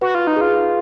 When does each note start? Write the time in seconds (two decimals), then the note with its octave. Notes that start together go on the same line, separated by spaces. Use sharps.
0.01 F#4 B4
0.15 F4
0.27 D#4
0.37 F4 G#4